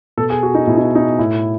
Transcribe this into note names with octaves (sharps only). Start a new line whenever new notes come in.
B2 A4
G#4
F#4
D#4
B2 E4
D#4
D#4
A2 E4